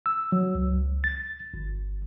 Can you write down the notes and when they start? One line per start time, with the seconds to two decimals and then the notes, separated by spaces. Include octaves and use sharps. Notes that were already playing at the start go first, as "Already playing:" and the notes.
0.06 E6
0.32 F#3
0.55 C#2
1.04 A6
1.54 G1